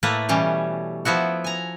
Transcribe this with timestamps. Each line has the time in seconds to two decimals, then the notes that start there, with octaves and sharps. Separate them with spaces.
0.03 A2 A3 A#3 B4
0.29 B2 E3 G3 C#4
1.05 F3 B3 E4 F#4
1.44 G#5 A#5